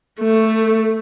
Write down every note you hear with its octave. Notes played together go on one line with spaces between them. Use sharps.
A3